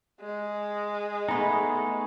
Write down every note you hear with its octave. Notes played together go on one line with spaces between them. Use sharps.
G#3
A3 B3 D#4 G#5 B5